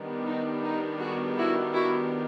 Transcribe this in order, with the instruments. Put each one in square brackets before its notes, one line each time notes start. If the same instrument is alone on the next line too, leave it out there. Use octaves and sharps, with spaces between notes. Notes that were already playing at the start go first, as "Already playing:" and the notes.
Already playing: [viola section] D#3 G3 B3 D4
D#4
D#4
F#4 G#4
E4 F#4
E4 F#4